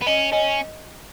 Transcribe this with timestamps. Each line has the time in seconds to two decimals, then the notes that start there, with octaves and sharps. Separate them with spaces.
0.02 B3
0.06 C#4 D#5
0.32 C#4 D#5